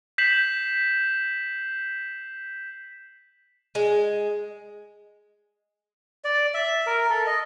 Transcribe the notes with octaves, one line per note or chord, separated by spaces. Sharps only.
G6 B6 C7 E7 F#7
G#3
D5
E5
A#4
A4
D#5